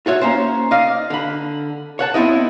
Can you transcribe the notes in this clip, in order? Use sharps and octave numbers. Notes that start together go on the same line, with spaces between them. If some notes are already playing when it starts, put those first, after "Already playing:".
F4 F#4 C#5 E5
A#3 C#4 C5
D5 D#5 F5
D3 B5
C#5 F#5 A5
B3 C4 E4 D#5